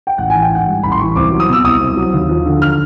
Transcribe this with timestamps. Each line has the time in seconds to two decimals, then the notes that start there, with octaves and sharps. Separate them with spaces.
0.07 G5
0.18 A1 F#5
0.30 E3 G#5
0.42 G5
0.51 G#2 F#5
0.67 G3
0.83 A1 B5
0.92 C6
0.99 E3 C#6
1.16 C2 D6
1.32 F#3
1.40 D#6
1.49 B2 E6
1.64 C2 D#6
1.81 C2
1.97 F#3
2.13 D#2
2.29 F3
2.46 D3
2.62 F6